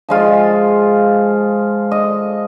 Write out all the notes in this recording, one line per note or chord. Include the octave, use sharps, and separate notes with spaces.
F3 G#3 F4
D#5